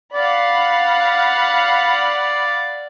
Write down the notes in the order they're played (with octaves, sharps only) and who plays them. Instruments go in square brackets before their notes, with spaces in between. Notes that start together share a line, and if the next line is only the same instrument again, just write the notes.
[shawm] D5 [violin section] F5 F#5 B5